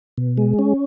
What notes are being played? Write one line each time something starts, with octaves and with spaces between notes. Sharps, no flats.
B2
G#3
C#4